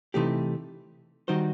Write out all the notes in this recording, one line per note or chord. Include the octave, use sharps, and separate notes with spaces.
C3 E3 A3 D#4 G4
D#3 G3 D#4 F#4 C5